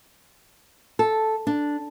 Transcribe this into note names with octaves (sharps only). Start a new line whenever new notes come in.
A4
D4